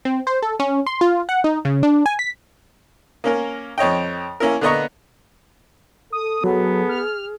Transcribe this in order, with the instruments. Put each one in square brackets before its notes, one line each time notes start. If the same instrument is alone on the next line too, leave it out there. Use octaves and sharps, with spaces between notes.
[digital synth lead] C4
C5
A4
C#4
C6
F4
F#5
D#4
C#3
D4
G#5
B6
[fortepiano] A#3 C#4 A#4
F2 C#5 D#5 G5
A#3 C#4 E4 A#4
D3 A#3 B3 D#5 A#5 C#6
[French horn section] A4 [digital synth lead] D#6
[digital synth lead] F#3 [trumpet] B3 [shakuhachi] G#4
[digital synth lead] F6